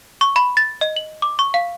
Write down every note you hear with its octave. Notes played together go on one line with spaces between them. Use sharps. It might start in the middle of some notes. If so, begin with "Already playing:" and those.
C#6
B5
A6
D#5
F#7
D6
C#6
F5